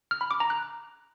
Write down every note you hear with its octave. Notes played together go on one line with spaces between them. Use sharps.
F6
B5
D6
A#5
F#6